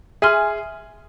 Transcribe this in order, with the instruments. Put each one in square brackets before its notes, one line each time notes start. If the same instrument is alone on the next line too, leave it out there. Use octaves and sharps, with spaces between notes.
[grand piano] G#4 [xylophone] E5 G#5 C6 F6